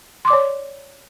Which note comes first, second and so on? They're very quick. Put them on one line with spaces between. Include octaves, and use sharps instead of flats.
C6 D6 D5 C#5